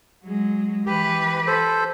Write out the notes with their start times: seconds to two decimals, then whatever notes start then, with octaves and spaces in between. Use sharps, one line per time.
0.23 F#3 G#3
0.86 E3 G4 B4
1.47 A4 C5